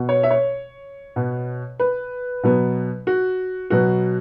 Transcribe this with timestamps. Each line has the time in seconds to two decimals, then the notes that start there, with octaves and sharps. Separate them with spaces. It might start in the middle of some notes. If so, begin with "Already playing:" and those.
Already playing: B2 B3
0.09 C#5
0.23 E5
0.31 C#5
1.16 B2 B3
1.80 B4
2.43 B2 F#3 B3
3.07 F#4
3.70 B2 F#3 B3 F#4